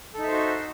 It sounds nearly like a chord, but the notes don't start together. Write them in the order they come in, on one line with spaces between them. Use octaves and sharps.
A4 D#4 E5 C5 F#4